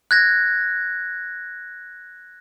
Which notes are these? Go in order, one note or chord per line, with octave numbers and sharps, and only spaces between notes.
F#6 G#6 A#6